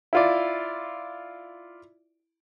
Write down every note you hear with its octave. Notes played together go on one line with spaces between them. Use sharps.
E4 F4 D5